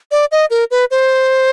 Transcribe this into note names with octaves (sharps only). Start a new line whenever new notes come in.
D5
D#5
A#4
B4
C5